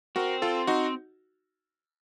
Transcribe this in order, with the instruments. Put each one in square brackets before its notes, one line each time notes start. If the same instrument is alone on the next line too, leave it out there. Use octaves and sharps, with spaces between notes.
[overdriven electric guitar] C4 [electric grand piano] F#4 A#4
[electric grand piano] F4 A4
D#4 F#4